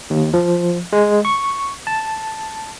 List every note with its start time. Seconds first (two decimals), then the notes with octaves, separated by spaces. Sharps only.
0.10 D#2
0.34 F3
0.93 G#3
1.25 C#6
1.87 A5